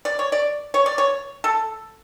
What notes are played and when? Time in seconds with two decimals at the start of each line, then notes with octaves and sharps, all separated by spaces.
0.05 D5
0.19 C#5
0.32 D5
0.74 C#5
0.86 D5
0.98 C#5
1.44 A4